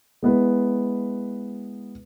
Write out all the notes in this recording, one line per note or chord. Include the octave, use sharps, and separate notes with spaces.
G#3 B3 E4 B4